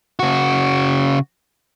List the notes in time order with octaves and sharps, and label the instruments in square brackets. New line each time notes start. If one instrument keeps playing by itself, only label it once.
[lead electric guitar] C#3 F#4